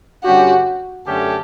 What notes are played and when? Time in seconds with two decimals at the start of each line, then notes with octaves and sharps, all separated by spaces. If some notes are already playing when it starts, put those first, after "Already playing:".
0.24 G2 D3 G3 C#4 F#4 G4
1.06 F#2 D3 A3 C#4 G4 A4